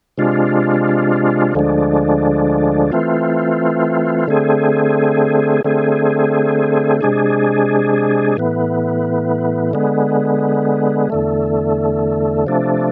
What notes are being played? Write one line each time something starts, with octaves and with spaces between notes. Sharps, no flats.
C3 G#3 D4 F4
D2 D3 F3 G#3 D4
E3 A3 C4 F4
D3 A3 C4 G#4
D3 A3 C4 G#4
C3 G#3 D4 G#4
A2 E3 B3
D3 G#3 B3
E2 D3 A3
C3 F3 A3 D4